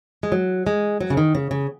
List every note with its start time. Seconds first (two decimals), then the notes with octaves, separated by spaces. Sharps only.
0.23 G#3
0.32 F#3
0.67 G#3
1.01 F#3
1.10 C#3
1.17 D#3
1.35 C#3
1.51 C#3